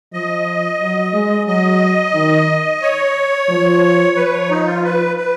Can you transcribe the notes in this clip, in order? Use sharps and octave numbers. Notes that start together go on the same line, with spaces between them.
F3 D#5
F#3
G#3
F#3 D#5
D#3
C#5
F3
F3 B4
C#5
D#4
F4
B4
B4